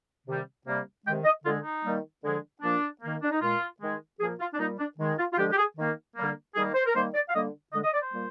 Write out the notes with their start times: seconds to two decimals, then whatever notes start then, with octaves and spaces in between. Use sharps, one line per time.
0.26 C3 D#3 G3
0.66 C3 G3 A#3
1.05 C3 D#3 G#3 G5
1.24 D#5
1.44 D3 F4
1.47 G#3
1.64 D#4
1.83 D#3 G3 A#3
2.23 D3 F3 G#3
2.62 A#2 F3 A#3 D4
3.01 D#3 A#3
3.22 D4
3.31 D#4
3.41 A#2 G#3 F4
3.81 D#3 G#3
4.19 A#2 F3 A#3 G#4
4.40 F4
4.53 D4
4.58 A#2 G3 A#3 D#4
4.79 D4
4.98 D#3 G#3
5.18 F4
5.33 F4
5.38 D3 F3 G#3 G4
5.51 G4
5.58 G#4
5.77 D#3 A#3
6.16 D3 G3 A#3
6.55 D#3 G3 A#3 G#4
6.75 C5
6.86 A#4
6.94 D#3 G3 A#3 C5
7.14 D5
7.29 F5
7.35 D3 G3 A#3 D#5
7.73 D3 D#5
7.76 G#3
7.83 D#5
7.94 D5
8.02 C5
8.12 A#2 G3 A#3